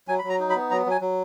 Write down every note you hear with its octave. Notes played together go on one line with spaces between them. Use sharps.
F#3 G#5
B5
F#3
A#5
D#4
B5
B3
F#3 A#5
F#3 G#5
F#3